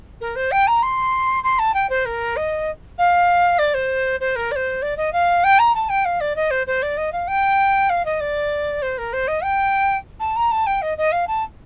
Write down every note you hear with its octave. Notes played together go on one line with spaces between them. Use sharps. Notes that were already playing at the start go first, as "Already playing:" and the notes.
A#4
C5
G5
A#5
C6
C6
A5
G5
C5
A#4
D#5
F5
D5
C5
C5
A#4
D5
C5
D5
D#5
F5
G5
A#5
A5
G5
F5
D5
D#5
C5
C5
D5
D#5
F5
G5
F5
D#5
D5
C5
A#4
C5
D#5
G5
A5
A#5
A5
G5
D#5
D#5
F5
A5